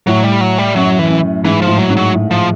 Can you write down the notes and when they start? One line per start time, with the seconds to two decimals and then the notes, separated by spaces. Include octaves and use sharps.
0.07 A2 F#3
0.23 G3
0.41 F#3
0.58 G3
0.76 F#2 F#3
0.99 E3
1.10 F#2
1.45 G#2 E3
1.62 F3
1.67 A2
1.78 F#3
1.90 G#2
1.97 F#3
2.14 A2
2.31 F3